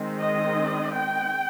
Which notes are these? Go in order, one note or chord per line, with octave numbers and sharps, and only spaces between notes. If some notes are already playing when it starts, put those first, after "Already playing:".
Already playing: D#3 G#3 C4
D#5
G5